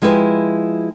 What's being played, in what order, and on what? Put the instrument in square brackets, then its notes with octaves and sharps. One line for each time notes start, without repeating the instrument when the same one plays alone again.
[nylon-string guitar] F3 G#3 E4 G4 B4 G#5